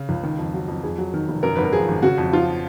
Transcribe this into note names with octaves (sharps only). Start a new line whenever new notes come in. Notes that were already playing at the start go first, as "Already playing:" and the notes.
Already playing: C#3
C#2
D#3
F2
F#3
F2
F2 G#4
F#3
D#3
F1
F#2 A#4
G#1 B4
A#4
F3 G#4
G#1
C#3 F#4
F2
F3 F4